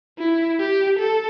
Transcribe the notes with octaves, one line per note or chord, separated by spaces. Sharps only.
E4
G4
A4